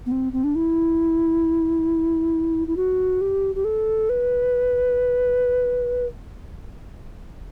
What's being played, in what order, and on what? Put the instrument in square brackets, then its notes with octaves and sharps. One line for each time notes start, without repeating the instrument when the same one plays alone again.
[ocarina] B3
C4
C4
D4
E4
E4
F#4
G4
G4
A4
B4